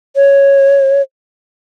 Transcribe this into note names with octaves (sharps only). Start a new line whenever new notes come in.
C#5